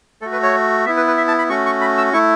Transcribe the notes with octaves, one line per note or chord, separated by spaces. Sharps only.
A3 F#4 A4
B4
C#5
B3 E4 E5
B4
B4
E5
A5
B5
A3 C#4 F#4 C#6
C#6
B5
E6
A3 E4 C#6